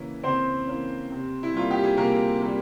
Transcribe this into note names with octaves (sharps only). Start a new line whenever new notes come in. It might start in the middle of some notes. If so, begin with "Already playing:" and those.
Already playing: C#3 E3 A#3 C#4 E4
C#3 C4 C5
E3 A#3 C#4
C3
E4
G3 A#3 F4
G4
G#4
C3 A#3 A#4
G3 A#3